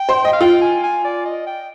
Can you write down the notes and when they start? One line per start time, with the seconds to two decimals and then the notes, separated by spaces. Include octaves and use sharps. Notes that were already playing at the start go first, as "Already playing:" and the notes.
Already playing: G5
0.09 C5
0.25 D#5
0.33 F5
0.41 F4 G5
0.61 G#5
0.83 G#5
1.05 D5
1.26 D#5
1.46 G5